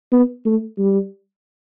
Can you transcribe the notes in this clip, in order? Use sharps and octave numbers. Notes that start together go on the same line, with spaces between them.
B3
A3
G3